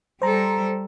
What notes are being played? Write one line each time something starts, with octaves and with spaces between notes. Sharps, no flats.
G3 A4 C5 A#5